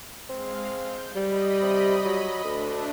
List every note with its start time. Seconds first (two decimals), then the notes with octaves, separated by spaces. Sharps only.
0.29 G#3 C4 F5
0.75 G6
1.16 G3 D#5 B5
1.62 C3
2.05 F#3
2.44 D2 A3 D4